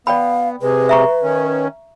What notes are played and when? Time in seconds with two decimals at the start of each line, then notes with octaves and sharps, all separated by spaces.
0.07 B3 D5 F5 G5 B5
0.62 C3 G#3 B4
0.89 E5 A#5 C#6
1.23 D#3 C#4